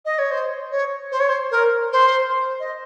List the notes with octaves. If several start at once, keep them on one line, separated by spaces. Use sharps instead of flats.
D#5
C#5
C5
C#5
C5
C#5
C5
A#4
C5
D#5